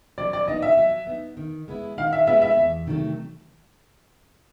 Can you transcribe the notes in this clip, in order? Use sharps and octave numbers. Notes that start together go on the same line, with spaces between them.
F#3 D5
D5
B3 D#4 D#5
E5
F#3
B3 D#4
D#3
G#3 B3 E4
D#3 F5
E5
G#3 B3 E4 E5
E5
E2
C3 D#3 F#3 A3